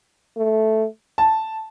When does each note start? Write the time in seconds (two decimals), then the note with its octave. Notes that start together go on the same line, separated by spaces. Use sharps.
0.37 A3
1.18 A5